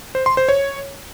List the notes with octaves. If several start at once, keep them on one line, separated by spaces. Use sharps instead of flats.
C5
C6
C5
C#5